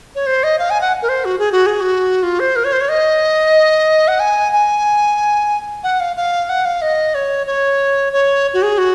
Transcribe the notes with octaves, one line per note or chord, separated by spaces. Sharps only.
C#5
C5
D#5
F5
G#5
F#5
A#4
C5
F#4
G#4
F#4
G#4
F#4
F4
C5
A#4
C#5
C5
C#5
D#5
F#5
G#5
G#5
F#5
F5
F5
F#5
F5
D#5
C#5
C#5
C#5
F#4
G#4
F#4